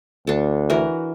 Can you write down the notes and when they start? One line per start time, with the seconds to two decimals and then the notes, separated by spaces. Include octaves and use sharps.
0.27 D2 D4 A4
0.70 E3 F#4 A#4